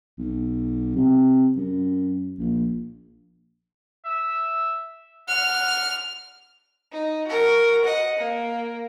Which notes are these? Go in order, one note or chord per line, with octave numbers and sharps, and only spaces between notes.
B1
C3
F#2
A#1
E5
F#5 F6
D#4
F#4 A#4
D#5 F#5
A#3